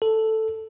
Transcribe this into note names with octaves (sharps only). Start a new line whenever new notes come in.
A4